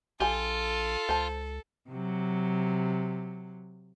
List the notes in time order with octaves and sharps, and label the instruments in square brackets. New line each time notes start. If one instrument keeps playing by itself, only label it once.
[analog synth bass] A#1 [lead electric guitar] F4 [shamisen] G4 G#5 [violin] A4
[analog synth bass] C#2 [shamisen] C5 A5
[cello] C3 F#3